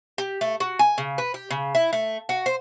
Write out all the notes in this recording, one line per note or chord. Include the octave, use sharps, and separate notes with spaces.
G4
A3
F#4
G#5
C#3
B4
G4
C#3
E4
A3
F#4
C5